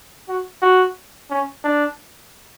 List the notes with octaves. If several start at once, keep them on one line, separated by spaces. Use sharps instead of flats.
F#4
F#4
C#4
D4